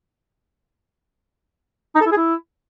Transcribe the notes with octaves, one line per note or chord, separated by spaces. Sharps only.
D#4
A4
E4
G#4
E4